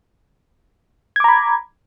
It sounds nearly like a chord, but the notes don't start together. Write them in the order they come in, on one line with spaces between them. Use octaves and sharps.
G#6 D6 A#5 B5